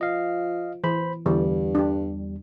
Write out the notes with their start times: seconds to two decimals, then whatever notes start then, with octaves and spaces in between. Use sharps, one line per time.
0.01 F3 D#5 F5
0.84 E3 C5 B5
1.26 E2 G2 D3 E3 G3
1.75 D4 G4